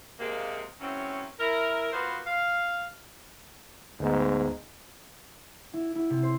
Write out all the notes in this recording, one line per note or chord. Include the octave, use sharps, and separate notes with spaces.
C3 G#3 A#3
E3 F#3 A3 C4 C#4
E4 A#4
A#3 B3 F4 F#4 B4 C5
F5
D2 G#2 B3
E4
E4
C3
C5